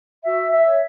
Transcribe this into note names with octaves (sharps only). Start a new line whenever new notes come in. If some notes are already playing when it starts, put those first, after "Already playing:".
F#4 E5
E5
C#5